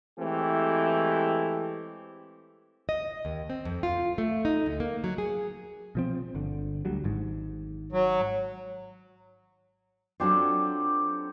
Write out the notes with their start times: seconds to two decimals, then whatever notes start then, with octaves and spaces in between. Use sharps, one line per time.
0.19 E3 G#3 A3 C4 G4
2.89 D#5
3.25 D#2
3.50 C4
3.65 F2
3.83 F4
4.18 A3
4.45 D#4
4.66 D2
4.80 A#3
5.04 F#3
5.18 G#4
5.95 B2 F3 C4
6.35 G1 D3
6.85 D2 F#3 G3
7.04 G#1 G#2
7.92 F#3
10.20 F#3 C4 D4 F4 G4 A4